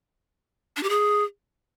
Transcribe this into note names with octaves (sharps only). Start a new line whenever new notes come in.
D4
G4
G#4